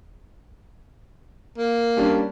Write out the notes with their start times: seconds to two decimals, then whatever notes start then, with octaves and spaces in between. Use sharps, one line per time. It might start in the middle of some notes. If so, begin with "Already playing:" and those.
1.58 A#3
1.97 G3 C#4 D4